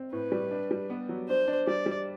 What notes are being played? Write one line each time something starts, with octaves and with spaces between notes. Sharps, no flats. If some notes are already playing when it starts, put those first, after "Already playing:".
Already playing: C4
A2 B4
G3
D4
G3
B3
F#3
D4 C5
D4
G3 D5
G3